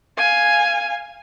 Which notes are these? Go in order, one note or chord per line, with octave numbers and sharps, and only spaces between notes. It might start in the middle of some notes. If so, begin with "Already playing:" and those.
F5 G#5